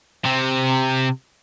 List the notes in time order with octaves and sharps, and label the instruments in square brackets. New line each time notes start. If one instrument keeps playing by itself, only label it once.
[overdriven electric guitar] C3 C4